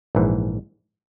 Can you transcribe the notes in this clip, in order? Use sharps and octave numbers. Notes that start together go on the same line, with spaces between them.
A#1 G#2 E3